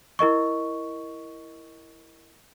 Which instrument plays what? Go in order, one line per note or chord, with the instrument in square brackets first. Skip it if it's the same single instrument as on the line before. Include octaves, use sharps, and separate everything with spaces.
[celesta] E4 A#4 D#5 C#6